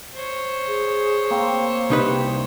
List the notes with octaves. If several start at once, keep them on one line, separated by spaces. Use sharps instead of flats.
C5 C#5
G#4
A#3 C4
C2 D#4 G4 B4